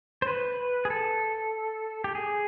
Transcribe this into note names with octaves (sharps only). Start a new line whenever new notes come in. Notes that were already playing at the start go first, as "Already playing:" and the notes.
C5
B4
G#4
A4
G4
G#4